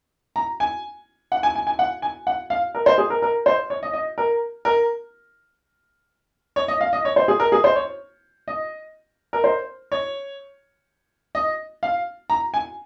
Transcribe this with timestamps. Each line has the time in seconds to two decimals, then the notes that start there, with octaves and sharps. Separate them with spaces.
0.36 A#5
0.60 G#5
1.32 F#5
1.43 G#5
1.55 G#5
1.67 G#5
1.79 F#5
2.02 G#5
2.27 F#5
2.50 F5
2.75 A#4
2.86 C5
2.98 G#4
3.10 A#4
3.22 A#4
3.46 C5
3.70 C#5
3.83 D#5
3.93 D#5
4.18 A#4
4.65 A#4
6.56 C#5
6.68 D#5
6.81 F5
6.93 D#5
7.05 C#5
7.16 C5
7.28 G#4
7.40 A#4
7.52 G#4
7.64 C5
7.76 C#5
8.48 D#5
9.33 A#4
9.44 C5
9.92 C#5
11.35 D#5
11.83 F5
12.30 A#5
12.54 G#5